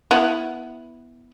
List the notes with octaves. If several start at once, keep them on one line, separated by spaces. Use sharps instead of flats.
B3 E4 F#5